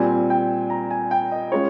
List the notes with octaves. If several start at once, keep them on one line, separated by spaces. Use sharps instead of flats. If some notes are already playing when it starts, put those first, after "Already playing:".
Already playing: A#2 G3 C4 G#5
G5
A#5
G#5
G5
D#5
G#3 C#4 F4 C#5